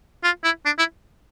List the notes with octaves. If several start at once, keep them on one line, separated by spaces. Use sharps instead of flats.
F4
E4
D4
E4